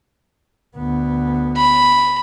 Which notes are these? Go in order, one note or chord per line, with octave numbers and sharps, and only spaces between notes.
D2 B3
B5